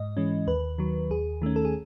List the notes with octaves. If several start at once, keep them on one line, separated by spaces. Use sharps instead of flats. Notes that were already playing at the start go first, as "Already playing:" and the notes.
Already playing: G#2 D#5
E3 G#3 C#4
D#2 B4
D#3 F#3
D#2 G#4
D#3 A3 C#4
A4
G#4